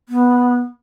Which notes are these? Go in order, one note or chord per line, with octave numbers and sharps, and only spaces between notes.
B3